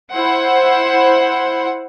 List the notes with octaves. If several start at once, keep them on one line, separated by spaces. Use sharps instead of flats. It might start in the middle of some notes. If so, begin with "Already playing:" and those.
E4 C5 F#5